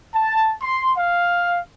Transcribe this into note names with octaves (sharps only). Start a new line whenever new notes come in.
A5
C6
F5